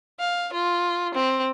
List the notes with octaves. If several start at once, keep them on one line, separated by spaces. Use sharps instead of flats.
F5
F4
C4